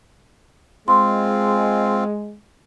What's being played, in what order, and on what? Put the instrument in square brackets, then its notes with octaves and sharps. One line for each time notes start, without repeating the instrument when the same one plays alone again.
[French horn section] G#3 [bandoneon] C4 F4 [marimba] C6